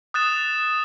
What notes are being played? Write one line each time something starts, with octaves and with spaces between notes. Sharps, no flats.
D#6 F#6 A6 E7